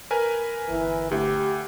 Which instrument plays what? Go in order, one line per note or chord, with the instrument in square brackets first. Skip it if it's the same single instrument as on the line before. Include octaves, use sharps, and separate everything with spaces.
[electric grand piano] A#4 B4 G#5
[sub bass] G1 [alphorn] E3
[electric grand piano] D2 [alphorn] G4